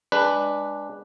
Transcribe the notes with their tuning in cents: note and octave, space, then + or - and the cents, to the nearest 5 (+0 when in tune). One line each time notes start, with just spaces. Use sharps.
G#3 -20 D4 +0 B4 +0